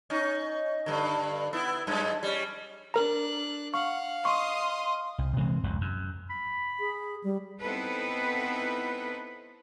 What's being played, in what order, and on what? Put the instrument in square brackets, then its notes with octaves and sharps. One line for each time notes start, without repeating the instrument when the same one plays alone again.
[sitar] C#4 D#4
G2 D3
B3 E4
F#2 G#3
G3 C#4
[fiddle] D4 F#6 [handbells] A#4 A#5
[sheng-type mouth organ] F5 [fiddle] F#5 [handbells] C#6
[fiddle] D#5 D#6 [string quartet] C6 [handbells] C#6
[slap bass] C2
C3 E3 G#3 C4
F1 C#2 F#2
F#2
[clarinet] B5
[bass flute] G#4
G3
[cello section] B3 C4 D#4 E4 A4 B4